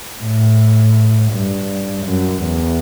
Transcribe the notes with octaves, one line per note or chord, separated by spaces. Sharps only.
A2
G2
F#2
E2